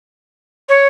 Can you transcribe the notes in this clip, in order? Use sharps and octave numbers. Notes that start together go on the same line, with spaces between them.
C#5